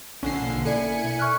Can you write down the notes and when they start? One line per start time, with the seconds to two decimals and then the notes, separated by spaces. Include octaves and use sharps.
0.23 A#1 D3 C#4 G#5 C7
0.41 B2 A#3
0.65 E4 A4 D5 G#5 C#7
1.19 C#6 F6 F#6